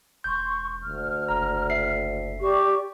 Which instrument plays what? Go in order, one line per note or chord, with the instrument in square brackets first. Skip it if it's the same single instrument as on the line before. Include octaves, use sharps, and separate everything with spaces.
[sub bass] E1 [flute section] C6 C#6 [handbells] G6
[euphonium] D2 [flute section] F6
[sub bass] F#1 [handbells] A#5
[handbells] E5 C7
[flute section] G4 D5 C#6